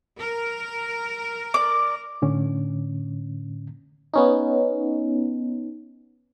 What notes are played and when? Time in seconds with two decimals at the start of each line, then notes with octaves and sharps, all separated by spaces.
0.19 A#4
1.54 D5 D6
2.22 A2 D3 C#4
4.14 B3 C#4 D#4